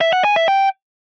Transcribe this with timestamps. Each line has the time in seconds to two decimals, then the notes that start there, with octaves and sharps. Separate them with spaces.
0.01 E5
0.13 F#5
0.24 G#5
0.36 E5
0.48 G5